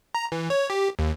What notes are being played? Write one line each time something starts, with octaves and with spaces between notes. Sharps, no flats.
A#5
E3
C#5
G4
D#2